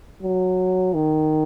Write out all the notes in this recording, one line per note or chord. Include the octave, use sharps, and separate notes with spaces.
F#3
D#3